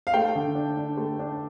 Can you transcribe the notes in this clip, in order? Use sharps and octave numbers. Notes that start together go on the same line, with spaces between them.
F5
A3 G5
D3
D4
D4
A3
D4